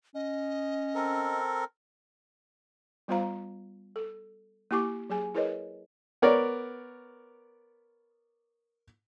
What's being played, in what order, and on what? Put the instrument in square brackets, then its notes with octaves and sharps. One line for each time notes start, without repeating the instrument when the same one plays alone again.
[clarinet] C#4 [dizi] D#5
[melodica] C4 A4 A#4
[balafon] G3 B3 F4 C5 F5 A#5
A4
A#3 E4 G4 G#5 C#6 D6
F#3 G#4 G#5
E4 G#4 A#4 B4 C#5 D#5
[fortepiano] B3 A#4 C#5 D5